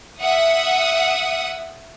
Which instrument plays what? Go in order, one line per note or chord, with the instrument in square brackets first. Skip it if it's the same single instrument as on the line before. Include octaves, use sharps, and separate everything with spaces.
[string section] E5 F#5 D#6